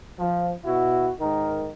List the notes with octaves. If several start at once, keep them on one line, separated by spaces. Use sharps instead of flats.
F3
B2 E4 F#4
G#2 D#3 D#4 A#4